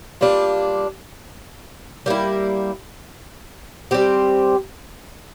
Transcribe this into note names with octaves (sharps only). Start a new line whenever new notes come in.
G3 A#3 D4 F4
G3 A#3 E4
G3 C4 G4